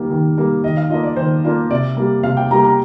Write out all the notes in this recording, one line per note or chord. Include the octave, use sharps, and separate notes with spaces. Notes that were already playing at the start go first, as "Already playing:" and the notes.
Already playing: D#3 G3 A#3
D#3
G3 A#3
D#3 D#5
F5
A#3 D4 F4 D#5
D5
D#3 C5
A#3 D4 F4
C3 D5
G3 A#3
C3 F5
G5
G3 A#3 A#5
A#5